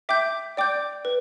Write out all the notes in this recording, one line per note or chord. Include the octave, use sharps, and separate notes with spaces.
E5 G5 D6 G6
D5 G5 D6 G6
B4